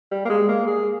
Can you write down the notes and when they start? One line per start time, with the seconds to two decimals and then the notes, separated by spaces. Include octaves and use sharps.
0.12 G3
0.25 A#3
0.30 G#3
0.49 A#3
0.68 G#4